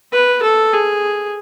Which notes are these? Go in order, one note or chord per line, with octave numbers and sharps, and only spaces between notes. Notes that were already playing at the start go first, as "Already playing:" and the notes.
B4
A4
G#4